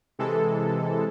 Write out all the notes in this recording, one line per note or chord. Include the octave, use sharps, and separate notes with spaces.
C3 E3 G#3 A4